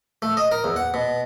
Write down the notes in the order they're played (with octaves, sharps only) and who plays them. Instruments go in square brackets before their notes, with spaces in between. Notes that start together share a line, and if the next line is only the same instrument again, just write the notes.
[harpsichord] A3
D#5
A#4
E2
F#5
B2